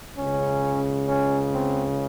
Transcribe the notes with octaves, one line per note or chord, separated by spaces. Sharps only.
C#2 C#3 C#4
C#4
C4